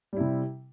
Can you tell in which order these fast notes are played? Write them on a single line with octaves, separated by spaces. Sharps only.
G3 E4 C3